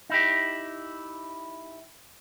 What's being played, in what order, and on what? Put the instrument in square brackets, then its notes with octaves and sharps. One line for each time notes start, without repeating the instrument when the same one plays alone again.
[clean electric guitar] D#4 E4 G4